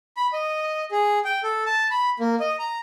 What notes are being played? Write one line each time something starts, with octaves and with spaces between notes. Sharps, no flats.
B5
D#5
G#4
G5
A4
A5
B5
A#3
D#5
A#5